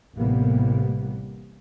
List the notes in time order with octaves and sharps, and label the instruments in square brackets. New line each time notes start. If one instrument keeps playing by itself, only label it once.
[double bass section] A1 A2 C3 G3 A#3 B3